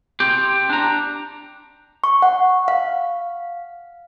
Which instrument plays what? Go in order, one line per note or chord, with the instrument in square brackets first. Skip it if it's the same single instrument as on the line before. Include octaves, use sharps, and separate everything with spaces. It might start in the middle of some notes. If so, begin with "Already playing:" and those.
[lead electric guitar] C4 G4
D4 A#5
[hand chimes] C#6
F#5
F5